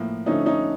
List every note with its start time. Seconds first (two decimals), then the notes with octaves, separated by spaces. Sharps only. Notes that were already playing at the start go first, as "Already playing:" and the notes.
Already playing: A2 F3 A#3
0.26 D3 F3 A3 C#4 D#4
0.46 C#4 D#4